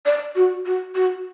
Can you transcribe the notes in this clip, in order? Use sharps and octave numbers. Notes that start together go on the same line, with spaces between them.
D5
F#4
F#4
F#4